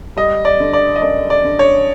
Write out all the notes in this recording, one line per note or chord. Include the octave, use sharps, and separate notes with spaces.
G3 D#5
D5
D3
D5
D#5
F#2 D5
D5
D3
C#5